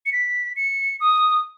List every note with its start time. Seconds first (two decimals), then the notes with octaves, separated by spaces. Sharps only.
0.06 C#7
0.13 B6
0.56 C#7
1.00 D#6